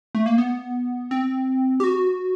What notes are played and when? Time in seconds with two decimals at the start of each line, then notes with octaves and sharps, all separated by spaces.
0.15 A3
0.26 A#3
0.38 B3
1.11 C4
1.80 G4
1.84 F#4